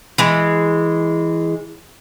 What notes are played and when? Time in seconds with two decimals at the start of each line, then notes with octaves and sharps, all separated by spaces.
0.18 E3 G#3